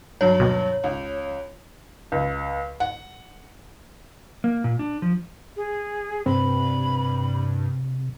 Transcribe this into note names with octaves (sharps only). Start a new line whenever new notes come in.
G2 F#3 C#5
D#2 B2
C#2
C#2
F#5
A#3
A#2
D4
F3
G#4
G2 C3 C4 B5